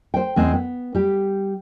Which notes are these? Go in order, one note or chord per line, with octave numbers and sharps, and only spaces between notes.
C5 G5
E2 G#3 C4
B3
G3 G4